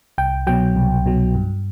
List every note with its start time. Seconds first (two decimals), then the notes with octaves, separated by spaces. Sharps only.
0.18 C2 G5
0.47 B2 F#3 G5
0.76 C2
1.06 B2 F#3
1.35 G2